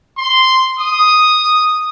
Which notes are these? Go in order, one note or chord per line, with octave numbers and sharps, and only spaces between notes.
C6
D#6